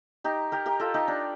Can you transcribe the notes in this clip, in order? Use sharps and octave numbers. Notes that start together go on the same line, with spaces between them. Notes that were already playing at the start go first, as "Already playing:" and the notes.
D#4 G4
G4 A#4
G4 A#4
F4 A4
D#4 G4
D4